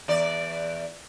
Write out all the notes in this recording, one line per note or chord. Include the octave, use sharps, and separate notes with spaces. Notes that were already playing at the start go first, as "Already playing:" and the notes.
E2 D5